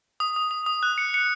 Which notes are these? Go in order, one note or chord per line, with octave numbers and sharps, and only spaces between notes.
D#6
D#6
D#6
D#6
F#6
C#7
C#7